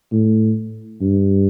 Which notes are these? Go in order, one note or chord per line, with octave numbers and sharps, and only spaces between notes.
A2
G2